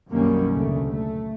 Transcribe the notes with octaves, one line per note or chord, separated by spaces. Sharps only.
B1 F#2 D#3 G3 A#3 C#4
A1 D2 C#3 A3
A3